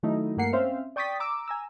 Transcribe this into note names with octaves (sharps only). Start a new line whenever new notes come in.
D#3 F#3 A3 D#4 E4
G2 A3 A#3 F#5 C7 C#7
C4 C#4 C5 E5 F5
D5 G5 C#6 D#6 A6 B6
A#5 D6 E6
G#5 A#5 E6